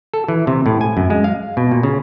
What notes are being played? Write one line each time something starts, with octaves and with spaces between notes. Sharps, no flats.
A4
E3
C3
A2
G#5
F#2
G#3
F5
B2
A#2
C#3